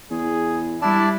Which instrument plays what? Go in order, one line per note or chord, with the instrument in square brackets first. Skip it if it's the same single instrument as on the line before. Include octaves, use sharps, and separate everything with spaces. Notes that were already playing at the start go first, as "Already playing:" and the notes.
[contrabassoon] E2 [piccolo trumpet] G#4
[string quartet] G3 [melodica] D4 D5 A5 [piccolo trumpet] E4